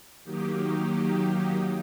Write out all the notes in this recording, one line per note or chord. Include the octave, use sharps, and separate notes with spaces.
D#3 F#3 A#3 D#4 G4